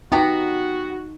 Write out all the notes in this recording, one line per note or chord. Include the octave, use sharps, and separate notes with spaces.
B3 D#4 F#4 G4 A#5